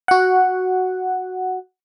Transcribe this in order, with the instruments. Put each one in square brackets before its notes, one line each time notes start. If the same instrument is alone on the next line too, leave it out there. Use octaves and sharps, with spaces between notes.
[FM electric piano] F#4 F#5